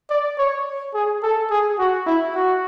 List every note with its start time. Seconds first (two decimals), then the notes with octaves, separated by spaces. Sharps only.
0.10 D5
0.38 C#5
0.94 G#4
1.23 A4
1.51 G#4
1.79 F#4
2.07 E4
2.35 F#4